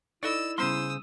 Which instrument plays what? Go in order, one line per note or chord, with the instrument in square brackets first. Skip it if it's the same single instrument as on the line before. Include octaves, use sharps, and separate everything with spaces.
[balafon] D#4 A4 B5 [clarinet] E4 [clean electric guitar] D5 D#5 [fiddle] E6
[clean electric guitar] C#3 C5 C6 [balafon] G3 B3 C#4 [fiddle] D#6 E6